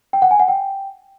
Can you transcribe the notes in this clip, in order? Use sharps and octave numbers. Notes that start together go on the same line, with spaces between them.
G5
F#5
G#5
F#5
G5